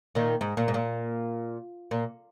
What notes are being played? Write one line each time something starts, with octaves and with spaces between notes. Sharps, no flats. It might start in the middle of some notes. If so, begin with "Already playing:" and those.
A#2 D#3
G#2
A#2
G#2
A#2
A#2